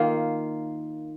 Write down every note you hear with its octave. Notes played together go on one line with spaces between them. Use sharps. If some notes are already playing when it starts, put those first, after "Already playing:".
Already playing: D#3 A#3 F4